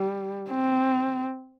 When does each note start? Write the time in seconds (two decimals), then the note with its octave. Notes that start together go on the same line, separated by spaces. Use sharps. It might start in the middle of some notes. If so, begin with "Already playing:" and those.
Already playing: G3
0.51 C4